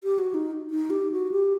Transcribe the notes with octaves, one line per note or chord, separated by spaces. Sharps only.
G4
F#4
D#4
D#4
G4
F#4
G4